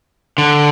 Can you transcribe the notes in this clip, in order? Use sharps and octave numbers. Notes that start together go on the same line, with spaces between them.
D3